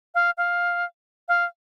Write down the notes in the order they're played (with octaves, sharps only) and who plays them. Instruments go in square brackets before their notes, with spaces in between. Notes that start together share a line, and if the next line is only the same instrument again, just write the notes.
[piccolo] F5
F5
F5